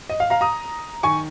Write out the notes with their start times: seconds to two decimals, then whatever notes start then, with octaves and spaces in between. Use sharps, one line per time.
0.10 D#5
0.20 F5
0.30 F5 A#5
0.41 A#5 D#6
1.03 D#3 G#5 C#6